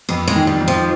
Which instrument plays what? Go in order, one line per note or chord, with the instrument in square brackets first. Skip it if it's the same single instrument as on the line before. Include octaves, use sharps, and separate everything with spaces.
[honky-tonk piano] F2 [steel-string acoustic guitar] B3
[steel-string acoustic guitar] G#3
[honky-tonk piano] D#3
[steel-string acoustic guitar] G3
[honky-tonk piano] F2
[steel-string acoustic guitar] F3